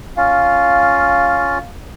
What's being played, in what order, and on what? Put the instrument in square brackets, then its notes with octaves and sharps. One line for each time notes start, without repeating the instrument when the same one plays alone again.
[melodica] C#4 F4 [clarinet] F5